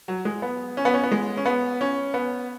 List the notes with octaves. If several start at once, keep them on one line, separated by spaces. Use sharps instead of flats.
F#3
G#3
B3
C#4
B3
C#4
B3
G#3
C#4
B3
C#4
B3